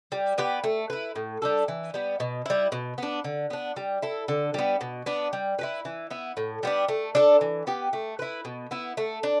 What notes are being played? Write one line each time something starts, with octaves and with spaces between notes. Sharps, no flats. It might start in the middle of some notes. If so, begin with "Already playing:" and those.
G3
B3 G4 B4
A3
E4 B4
A2
G3 D4 A4
E3
G3 B3
B2
G3 E4
B2
B3 D4
D3
B3 D4
G3
E4 A4
D3
G3 B3
B2
B3 D4
G3
E4 G4 B4
E3
B3 E4
A2
G3 B3 D4
A3
D4 A4
E3
B3 G4
A3
E4 B4
B2
B3 E4
A3
D4